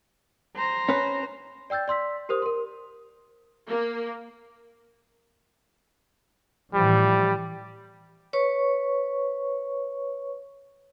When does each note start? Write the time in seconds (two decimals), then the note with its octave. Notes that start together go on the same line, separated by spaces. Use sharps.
0.56 C5 A#5
0.89 C#4 B4
1.70 D5 G5 E6 G6 A6
1.88 D5 C6 E6 B6
2.29 G4 A#4 C5 D#6
2.42 A#4 C6
3.68 A#3
6.74 A2 E3 F3 G3
8.33 B4 C#5 C#6